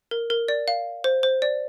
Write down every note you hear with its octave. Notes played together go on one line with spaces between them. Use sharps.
A#4
A#4
D5
F5
C5
C5
D5